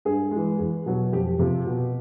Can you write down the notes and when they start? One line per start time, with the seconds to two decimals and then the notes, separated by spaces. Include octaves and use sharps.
0.05 G2 G#4
0.31 E3 G#3
0.59 E2
0.86 B2 F#3
1.13 F2 G4
1.39 C3 F3
1.66 B2